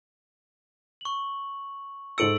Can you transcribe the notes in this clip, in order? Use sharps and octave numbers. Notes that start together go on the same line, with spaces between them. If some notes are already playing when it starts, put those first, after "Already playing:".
C#6 F#7
G#2 A4 E6 C#7 D7 F#7